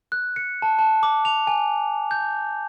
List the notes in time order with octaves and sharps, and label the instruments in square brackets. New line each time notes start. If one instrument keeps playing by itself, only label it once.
[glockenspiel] F#6
C#7
A5
A5
D6
F7
G#5
G6